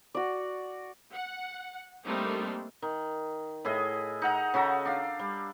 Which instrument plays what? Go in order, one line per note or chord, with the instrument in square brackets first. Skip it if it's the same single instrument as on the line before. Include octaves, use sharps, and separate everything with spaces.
[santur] F#4 D5
[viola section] F#5
G3 A3 A#3 C4 D4 D#4
[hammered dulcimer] D#3
A2 E4 G#4 D#5
D#4 F#5 A#5
C#3 F#4 A4 A#5
D4 F5
G3